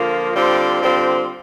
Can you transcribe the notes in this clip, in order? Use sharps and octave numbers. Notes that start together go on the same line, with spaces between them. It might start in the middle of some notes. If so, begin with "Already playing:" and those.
Already playing: D3 F3 A#3 F4
D3 G3 C4 F4 C5
D3 G3 C4 F4 C5